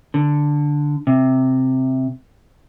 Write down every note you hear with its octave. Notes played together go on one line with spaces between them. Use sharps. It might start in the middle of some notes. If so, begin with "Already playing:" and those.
D3
C3